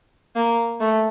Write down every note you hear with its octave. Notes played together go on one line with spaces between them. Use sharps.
A#3
A3